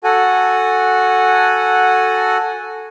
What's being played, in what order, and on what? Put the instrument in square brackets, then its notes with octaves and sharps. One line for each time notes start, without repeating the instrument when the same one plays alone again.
[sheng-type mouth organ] F#4 A4 F#5 G#5